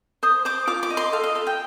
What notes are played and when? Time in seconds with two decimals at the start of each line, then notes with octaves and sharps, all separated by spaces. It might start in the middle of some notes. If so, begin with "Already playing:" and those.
0.23 C5 D#6
0.45 C5 D6
0.67 F4 D6
0.83 D6
0.90 D#5
0.97 C6
1.12 A4 F5
1.24 D#5
1.35 A4 F5
1.47 G5